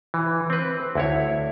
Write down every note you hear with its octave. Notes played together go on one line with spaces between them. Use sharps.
E3
C4 B4
D2 E4 C#5